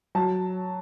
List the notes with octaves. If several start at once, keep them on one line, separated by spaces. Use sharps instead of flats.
F#3 A5